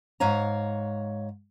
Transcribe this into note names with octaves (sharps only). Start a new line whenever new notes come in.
G#2 C#5 F5 A#5